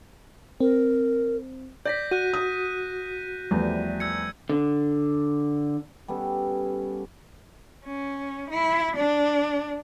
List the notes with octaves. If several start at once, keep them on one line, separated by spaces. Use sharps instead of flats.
C4 A#4
D5 G6 A#6 B6
F#4 F#6 G6 D#7
D#6
E2 F3 G3 A3
E6 G#6 C#7
D3
G3 B3 C#4 A4
C#4
E4
D4